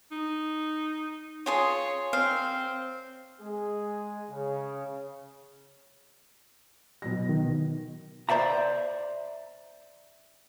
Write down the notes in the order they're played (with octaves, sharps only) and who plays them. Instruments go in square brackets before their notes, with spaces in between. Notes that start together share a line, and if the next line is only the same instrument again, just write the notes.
[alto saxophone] D#4
[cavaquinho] F4 G#4 C6 [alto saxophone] C#5
[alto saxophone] C4 [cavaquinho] F5
[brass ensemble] G#3 G#4
C#3
[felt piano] B2 F#3 A#6
[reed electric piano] D#3
[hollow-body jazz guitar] C5 D5 E5 A#5